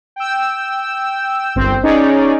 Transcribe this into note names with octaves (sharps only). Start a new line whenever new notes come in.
G5 E6
G1 C2 C4 C5
C#4 D#4 G#4 C#5 D5